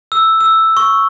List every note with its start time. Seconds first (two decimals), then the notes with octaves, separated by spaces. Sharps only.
0.12 E6
0.41 E6
0.77 C#6